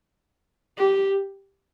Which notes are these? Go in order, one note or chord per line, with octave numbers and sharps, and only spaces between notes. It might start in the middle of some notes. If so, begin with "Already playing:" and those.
G4